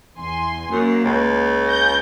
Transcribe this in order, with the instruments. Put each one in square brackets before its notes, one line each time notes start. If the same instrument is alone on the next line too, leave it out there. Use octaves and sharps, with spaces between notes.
[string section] E2 G#5 C6
[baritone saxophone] F#2 [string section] A#3
[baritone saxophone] C#2
[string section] G6 A#6